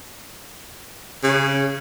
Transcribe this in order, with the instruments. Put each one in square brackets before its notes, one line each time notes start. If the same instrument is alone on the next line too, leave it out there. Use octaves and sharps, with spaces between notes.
[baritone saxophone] C#3